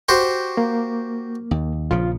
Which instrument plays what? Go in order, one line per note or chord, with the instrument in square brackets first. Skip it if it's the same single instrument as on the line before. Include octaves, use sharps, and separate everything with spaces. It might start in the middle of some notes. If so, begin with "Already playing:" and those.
[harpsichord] F#4 G4 C5
[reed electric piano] A#3
[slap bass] D#2
[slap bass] A#1 C#3 F3 [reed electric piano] F4